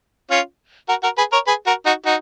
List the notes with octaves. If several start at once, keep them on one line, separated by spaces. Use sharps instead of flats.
C#4 F4
F#4 A#4
F#4 A#4
G#4 B4
A#4 C#5
G#4 B4
F#4 A#4
D#4 F#4
D#4 F#4